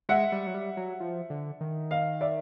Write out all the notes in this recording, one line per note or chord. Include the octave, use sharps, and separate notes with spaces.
G#3 E5 F#5
G3
F#3
G3
F#3
F3
D3
D#3
D#5 F5
D5 E5